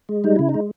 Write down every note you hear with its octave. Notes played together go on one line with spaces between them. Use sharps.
G#3
G3 D#4
C#3 E4
D#4
G#3